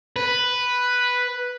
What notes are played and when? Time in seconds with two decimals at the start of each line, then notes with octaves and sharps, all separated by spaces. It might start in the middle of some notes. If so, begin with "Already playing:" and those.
0.16 B4